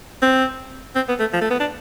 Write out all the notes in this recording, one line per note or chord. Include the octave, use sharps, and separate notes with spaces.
C4
C4
B3
A3
F3
A3
B3
D4